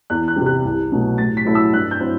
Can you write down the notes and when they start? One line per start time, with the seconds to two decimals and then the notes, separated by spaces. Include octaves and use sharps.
0.10 E2 F#6
0.28 F#6
0.36 C3 G3
0.46 F#6
0.65 C2
0.92 B2 F#3 A3
1.18 A2 A6
1.37 B6
1.45 F#3 A3 E4
1.55 E6
1.73 G2 F#6
1.91 G6
2.00 F#3 C4 E4